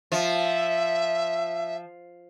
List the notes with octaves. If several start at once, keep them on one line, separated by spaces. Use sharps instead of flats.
F3 E5